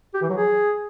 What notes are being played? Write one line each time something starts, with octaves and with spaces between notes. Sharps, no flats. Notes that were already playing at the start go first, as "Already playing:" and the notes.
G4
E3
F#3
G#4